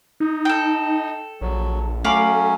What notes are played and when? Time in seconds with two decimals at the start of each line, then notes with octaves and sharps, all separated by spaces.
0.20 D#4
0.45 A4 G5
1.41 A#1 F#3
2.04 F#3 A3 C#4 F5 B5 D6